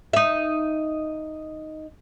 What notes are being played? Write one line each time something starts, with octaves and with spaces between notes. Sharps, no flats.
D#4 E5